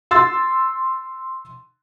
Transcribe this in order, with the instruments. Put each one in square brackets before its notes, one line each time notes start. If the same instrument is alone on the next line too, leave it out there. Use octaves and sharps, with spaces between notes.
[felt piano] C6 E6 A6